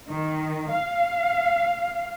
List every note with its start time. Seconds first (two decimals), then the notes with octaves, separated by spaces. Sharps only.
0.12 D#3
0.73 F5